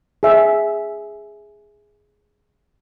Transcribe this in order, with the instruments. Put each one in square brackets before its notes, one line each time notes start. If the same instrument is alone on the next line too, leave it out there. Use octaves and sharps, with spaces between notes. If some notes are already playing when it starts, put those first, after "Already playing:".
[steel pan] G#4 E5